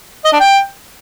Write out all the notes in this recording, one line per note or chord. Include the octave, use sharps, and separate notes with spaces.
D#5
D4
G5